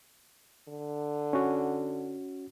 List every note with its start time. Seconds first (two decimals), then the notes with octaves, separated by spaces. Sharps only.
0.68 D3
1.33 C#4 F#4